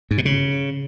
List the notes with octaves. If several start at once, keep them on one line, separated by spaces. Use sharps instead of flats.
G#2
B2
C#3